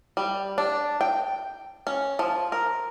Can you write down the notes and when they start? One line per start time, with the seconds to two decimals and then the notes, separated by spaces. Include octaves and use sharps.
0.17 G3
0.58 D4
1.01 G5
1.87 C#4
2.19 F3
2.52 A#4